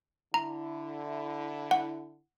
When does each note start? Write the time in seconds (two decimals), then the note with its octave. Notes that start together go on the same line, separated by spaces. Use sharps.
0.34 D3 E4 A#5
1.71 F#5